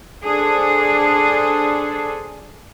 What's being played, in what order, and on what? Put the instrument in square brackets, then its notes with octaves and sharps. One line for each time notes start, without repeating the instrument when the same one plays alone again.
[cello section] D4 G#4 A4 C5